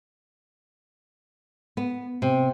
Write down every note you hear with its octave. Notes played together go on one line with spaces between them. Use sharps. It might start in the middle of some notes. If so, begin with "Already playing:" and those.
B3
C3